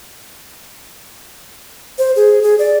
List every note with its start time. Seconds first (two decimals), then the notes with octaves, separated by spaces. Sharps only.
1.98 C5
2.16 G#4
2.43 G#4
2.59 D5